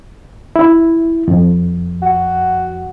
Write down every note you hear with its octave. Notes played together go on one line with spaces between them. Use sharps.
E4
F2
F#4